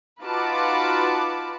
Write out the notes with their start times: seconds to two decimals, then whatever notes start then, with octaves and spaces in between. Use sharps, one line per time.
0.22 D#4 F4 F#4 B4 A5 D6